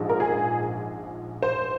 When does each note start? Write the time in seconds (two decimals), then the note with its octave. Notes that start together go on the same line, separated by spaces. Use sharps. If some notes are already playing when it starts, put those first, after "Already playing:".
Already playing: A#1 G#2 F3 G#3
0.09 A#4
0.20 G#4
1.42 C5